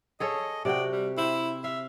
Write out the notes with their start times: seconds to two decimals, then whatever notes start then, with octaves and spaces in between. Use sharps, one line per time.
0.20 G#4 A4 C#5 D#5
0.65 C3 F#4 D5 G5
0.92 G3
1.18 E4 C5
1.64 E5 F5